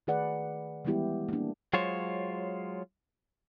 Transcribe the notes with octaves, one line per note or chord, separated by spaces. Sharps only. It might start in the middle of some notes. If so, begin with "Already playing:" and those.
D#3 A3 G#4 B4 D5 F#5
E3 G3 G#3 B3 E4 G4
A#3 D4
F#3 G#3 F4 C5 C#5